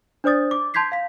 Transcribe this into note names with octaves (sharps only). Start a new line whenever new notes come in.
D4 C5 D5 D#6 A6
D6
A5 C6 G6 G#6 B6 C7
F5 B6